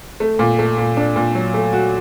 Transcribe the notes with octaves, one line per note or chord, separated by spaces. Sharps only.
A3
A#2
A3
A#2
D4
A#2
F#3
A3
F#4